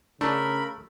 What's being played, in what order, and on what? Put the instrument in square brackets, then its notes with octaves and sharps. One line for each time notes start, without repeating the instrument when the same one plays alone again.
[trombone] C#3 [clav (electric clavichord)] A3 [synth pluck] D4 [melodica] A#4 B5